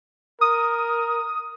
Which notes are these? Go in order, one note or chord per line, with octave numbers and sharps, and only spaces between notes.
A#4 D#6